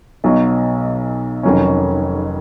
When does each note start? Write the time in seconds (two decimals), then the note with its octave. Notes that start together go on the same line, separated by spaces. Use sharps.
0.24 B1 B2 F#3
1.43 F1 F2 D#3 F#3 C#4